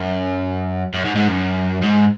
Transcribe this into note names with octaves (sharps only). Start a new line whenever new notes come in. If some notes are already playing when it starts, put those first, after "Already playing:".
Already playing: F#2
F#2
G#2
G#2
F#2
G#2